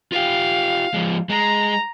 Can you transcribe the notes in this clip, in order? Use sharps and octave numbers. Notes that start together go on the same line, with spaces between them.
F4 G4 F5
F3 G#3
G#3 A#5